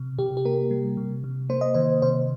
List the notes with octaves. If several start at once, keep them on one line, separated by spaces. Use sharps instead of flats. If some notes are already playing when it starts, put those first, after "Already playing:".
Already playing: C3
C3 G4
G4
A#3 A#4
G3
C3
C3
A#3 C5
D#5
D#3 C5
C3 C5